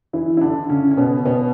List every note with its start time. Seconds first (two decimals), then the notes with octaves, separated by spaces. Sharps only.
0.13 E3 E4
0.37 E4
0.41 D3 D4
0.70 C#3 C#4
0.91 C#4
0.97 B2 B3
1.25 B2 B3